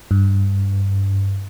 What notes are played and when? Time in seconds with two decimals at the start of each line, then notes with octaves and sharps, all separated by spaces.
0.11 G2